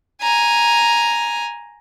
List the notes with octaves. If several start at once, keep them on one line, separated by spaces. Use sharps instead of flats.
G#5 A#5